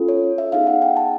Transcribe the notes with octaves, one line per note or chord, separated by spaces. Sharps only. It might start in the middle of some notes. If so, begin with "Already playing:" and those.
Already playing: C#4 F4 A4
C#5
E5
B3 D#4 G#4 F5
F#5
G5
A5